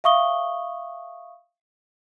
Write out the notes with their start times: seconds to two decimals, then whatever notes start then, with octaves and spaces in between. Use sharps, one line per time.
0.04 E5 F5 C#6 D#6 G7